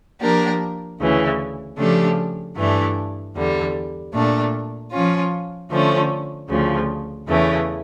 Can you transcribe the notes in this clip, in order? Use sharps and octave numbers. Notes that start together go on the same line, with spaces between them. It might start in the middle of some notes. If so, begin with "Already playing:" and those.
F3 A#3 D4 G4 A#4
D2 C#3 E3
C#3 F3 A3 D4 G4
G2 E3 A3 D4
E2 D3 G3
A#2 A3 D4
F3 C#4 F4
D3 F3 A3 C#4
D2 C#3 F3
E2 C#3 E3 A3